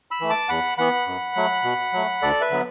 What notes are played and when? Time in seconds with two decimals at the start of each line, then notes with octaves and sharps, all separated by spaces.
0.11 B5 E6
0.21 E3 A3
0.30 A5 D6
0.49 E2 F#5 B5
0.78 E3 B3 F#5 B5
1.07 F#2
1.36 F#3 A3
1.64 B2
1.93 F#3 A3
2.22 D2 A4 D5
2.41 B4 E5
2.51 D3 F#3 B3